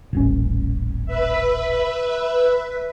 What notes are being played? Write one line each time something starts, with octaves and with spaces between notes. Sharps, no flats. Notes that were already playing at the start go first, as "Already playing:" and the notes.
D#1 A1 C#4
B4 E5